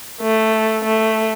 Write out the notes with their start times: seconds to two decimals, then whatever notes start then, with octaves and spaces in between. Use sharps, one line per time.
0.21 A3
0.84 A3